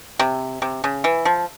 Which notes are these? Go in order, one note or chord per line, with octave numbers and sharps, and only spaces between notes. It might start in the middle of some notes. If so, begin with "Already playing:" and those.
C3
C3
C#3
E3
F3